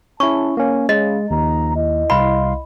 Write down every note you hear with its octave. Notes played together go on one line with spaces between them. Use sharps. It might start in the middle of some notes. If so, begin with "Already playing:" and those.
C#3 C#4 E4 G#4 A5 C#6
C#2 A#3 C#4
C#3 G#3 D#5
D#2 F3 D#4 A#5
E4 D#5
C2 F5 B5 C6